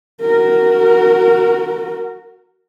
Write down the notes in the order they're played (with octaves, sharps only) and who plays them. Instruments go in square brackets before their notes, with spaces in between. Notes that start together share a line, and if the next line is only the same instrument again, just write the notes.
[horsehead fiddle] F#4 A#4